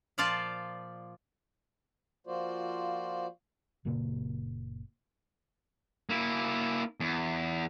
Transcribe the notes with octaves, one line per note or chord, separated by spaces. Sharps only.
A#2 F3 F4 D5 F5 A5
F3 A#3 F4 F#4 C5 D5
F#1 A#2 C#3 A#3
A#3 E4
E2